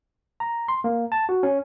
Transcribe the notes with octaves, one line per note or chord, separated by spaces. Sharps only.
A#5
C6
A#3
A5
F#4
C#4